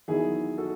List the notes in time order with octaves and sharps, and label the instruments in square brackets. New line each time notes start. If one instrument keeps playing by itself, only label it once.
[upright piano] E2 D#3 F#3 E4 G#4
F#4 A4